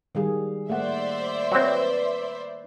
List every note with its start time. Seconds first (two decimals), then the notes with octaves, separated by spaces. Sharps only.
0.15 D#3 G3 G#4 F5
0.70 A3 A#3 C5 D5 E5 F#5
1.52 F#3 C4 B4